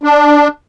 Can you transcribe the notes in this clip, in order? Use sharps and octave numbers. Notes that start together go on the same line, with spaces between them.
D4